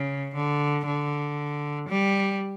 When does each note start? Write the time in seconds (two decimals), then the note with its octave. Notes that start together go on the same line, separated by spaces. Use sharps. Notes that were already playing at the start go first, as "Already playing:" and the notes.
Already playing: C#3
0.35 D3
0.86 D3
1.89 G3